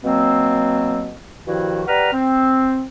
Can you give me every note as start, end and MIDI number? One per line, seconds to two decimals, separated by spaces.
0.03 1.12 47
0.03 1.12 54
0.03 1.12 58
0.03 1.12 60
1.46 1.81 43
1.46 1.81 51
1.46 1.81 53
1.46 1.81 64
1.46 1.81 66
1.87 2.09 55
1.87 2.09 71
1.87 2.09 78
1.87 2.09 82
1.87 2.09 89
2.12 2.85 60